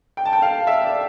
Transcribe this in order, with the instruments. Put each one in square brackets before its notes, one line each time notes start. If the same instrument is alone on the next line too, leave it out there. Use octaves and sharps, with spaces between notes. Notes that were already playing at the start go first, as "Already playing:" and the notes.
[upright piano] G5
A5
G5
F5
E5
D5